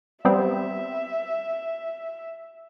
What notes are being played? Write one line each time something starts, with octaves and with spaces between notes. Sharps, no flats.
G3 B3 C4 E5